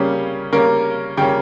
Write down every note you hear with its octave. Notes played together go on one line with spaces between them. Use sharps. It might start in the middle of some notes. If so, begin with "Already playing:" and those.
Already playing: C#3 G3 A#3 C#4 F5
C#3 G3 A#3 C#4 A#4
C#3 G3 A#3 C#4 G5